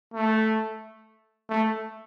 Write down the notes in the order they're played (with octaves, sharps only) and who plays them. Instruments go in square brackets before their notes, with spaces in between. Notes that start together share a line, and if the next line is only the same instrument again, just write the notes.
[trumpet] A3
A3